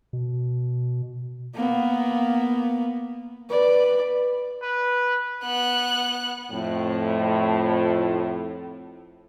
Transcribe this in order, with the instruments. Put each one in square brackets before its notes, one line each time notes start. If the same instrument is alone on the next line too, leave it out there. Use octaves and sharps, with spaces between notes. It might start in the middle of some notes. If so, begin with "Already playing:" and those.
[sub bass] B2
[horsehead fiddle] A#3 B3
[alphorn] B4 [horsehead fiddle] D5
[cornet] B4
[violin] B3 F#6
[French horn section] F2 A2